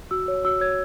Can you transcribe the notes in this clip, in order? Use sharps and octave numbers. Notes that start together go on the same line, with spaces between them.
F#4 E6
C#5
F#4 E6
C#5 G#6